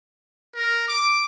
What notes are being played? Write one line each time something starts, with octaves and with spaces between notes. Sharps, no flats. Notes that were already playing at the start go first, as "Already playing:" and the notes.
A#4
D6